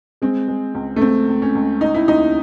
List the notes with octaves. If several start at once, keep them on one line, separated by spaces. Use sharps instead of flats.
G#3 C4
G#3
C#2
A3
C#2 C4
C#2
C#4
C#2
C#3 D#4
E4
D#2 D#4